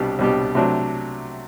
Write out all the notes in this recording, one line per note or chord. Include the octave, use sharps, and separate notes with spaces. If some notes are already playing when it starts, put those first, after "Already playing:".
Already playing: C2 B2 G3 D4 G4
C2 B2 G3 D4 G4
C3 F#3 A3 D4